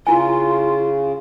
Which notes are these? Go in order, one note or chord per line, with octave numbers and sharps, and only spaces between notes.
C#3 E4 F4 G#5